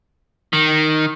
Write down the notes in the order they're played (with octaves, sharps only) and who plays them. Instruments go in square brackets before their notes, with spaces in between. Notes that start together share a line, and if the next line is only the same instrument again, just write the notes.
[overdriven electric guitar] D#3